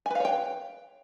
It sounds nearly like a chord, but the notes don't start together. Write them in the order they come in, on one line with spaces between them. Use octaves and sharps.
G#5 B4 F5 C#5 G5